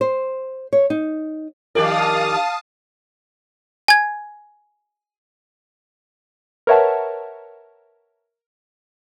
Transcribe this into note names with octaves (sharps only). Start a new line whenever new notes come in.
C5
C#5
D#4
D#3 G4 A#4 D5 F5 A5 D#6
G#5 G#6
A#4 B4 C#5 E5 F#5 A5